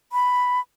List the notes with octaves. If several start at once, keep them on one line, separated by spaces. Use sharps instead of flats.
B5